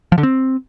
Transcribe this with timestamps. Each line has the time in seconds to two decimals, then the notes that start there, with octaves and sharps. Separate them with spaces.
0.12 F3
0.18 D3
0.23 C4